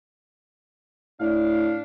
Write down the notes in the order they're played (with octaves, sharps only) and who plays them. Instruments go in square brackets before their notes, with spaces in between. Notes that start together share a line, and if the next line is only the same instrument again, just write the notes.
[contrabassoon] A2 [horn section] D4 F5